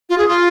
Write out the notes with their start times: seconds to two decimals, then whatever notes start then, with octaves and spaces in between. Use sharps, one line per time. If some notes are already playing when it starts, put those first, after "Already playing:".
0.10 F4
0.18 G#4
0.28 F4